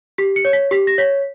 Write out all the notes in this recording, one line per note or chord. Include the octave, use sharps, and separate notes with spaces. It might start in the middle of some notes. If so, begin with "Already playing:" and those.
G4 B6
C#7
C#5
B6
G4 B6
A#6
C#5 B6